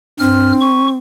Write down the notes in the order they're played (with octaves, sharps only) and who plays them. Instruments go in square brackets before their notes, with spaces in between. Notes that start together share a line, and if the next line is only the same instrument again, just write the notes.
[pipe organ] G2 F6 [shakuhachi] C4
[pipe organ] C#6